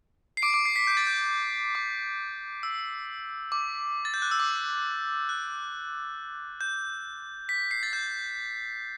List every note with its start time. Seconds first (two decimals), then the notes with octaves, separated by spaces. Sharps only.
0.37 C7
0.42 D6 D7
0.53 D6 D7
0.65 C7
0.76 B6
0.87 G6
0.97 A6
1.07 G6
1.75 D6
2.63 E6
3.52 D6
4.05 A6
4.14 G6
4.22 F#6
4.31 E6
4.40 D6
5.29 F#6
6.61 G6
7.49 B6
7.71 C7
7.83 A6
7.93 G6